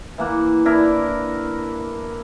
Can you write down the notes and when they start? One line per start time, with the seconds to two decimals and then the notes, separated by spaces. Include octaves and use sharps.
0.18 E3 A#3 F#5
0.65 D4 E4 A#4